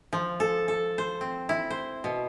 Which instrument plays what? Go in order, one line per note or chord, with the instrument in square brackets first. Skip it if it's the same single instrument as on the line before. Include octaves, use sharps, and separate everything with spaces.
[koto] F3
A4
A4
C5
C4
E4
C5
B2